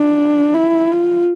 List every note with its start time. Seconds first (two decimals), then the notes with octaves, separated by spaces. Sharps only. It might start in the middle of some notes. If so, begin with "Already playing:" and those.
Already playing: D4
0.54 E4
0.91 F4